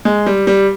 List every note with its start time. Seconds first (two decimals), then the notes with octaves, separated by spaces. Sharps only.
0.05 G#3
0.26 G3
0.47 G3